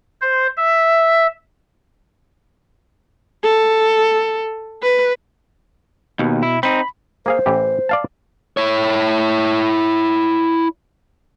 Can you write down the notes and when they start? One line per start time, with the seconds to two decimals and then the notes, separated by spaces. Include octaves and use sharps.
0.21 C5
0.57 E5
3.44 A4
4.83 B4
6.19 D#2 B2
6.43 E4
6.63 C4 D#4 B5
7.26 A#3 G#4 C5 F5
7.46 A1 E3 G4
7.89 D5 F5 A5
8.57 E4 C#5